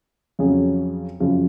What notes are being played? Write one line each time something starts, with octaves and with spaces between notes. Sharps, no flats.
F2 C#3 F#3 C#4 G#4
F#2 C#3 F3